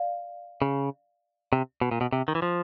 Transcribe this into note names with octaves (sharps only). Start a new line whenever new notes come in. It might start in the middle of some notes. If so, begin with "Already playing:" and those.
Already playing: D5 F5
C#3
C3
B2
A#2
B2
C3
D#3
E3
F3